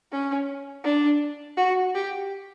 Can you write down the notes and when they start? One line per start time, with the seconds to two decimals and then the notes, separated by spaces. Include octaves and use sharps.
0.12 C#4
0.84 D4
1.57 F#4
1.95 G4